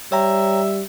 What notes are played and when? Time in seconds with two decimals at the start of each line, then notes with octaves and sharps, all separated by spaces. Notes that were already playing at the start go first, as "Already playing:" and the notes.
0.12 G3 C#5 E5 G5 A#5